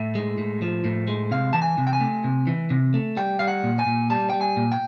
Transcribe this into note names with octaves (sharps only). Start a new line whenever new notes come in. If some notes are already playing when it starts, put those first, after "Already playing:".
Already playing: A2 E5
G#3
A2
F3
A2
G#3
C3 F5
E3 A5
G#5
C3
G5
G#5
A3
C3
E3
C3
A3
G3 G5
G3 F5
F#5
A#2
G#5
A#2
G3 A5
G3 G5
G#5
A#2
G5